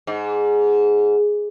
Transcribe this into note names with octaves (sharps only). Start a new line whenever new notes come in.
G#2